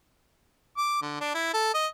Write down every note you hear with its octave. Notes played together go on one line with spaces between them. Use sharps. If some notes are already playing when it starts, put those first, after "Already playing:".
D6
D3
D4
E4
A4
D#5